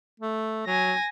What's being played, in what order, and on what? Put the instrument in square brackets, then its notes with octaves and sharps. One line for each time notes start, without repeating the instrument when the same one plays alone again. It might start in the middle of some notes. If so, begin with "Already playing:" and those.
[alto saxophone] A3
[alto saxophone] F#3 [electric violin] G#5 A#6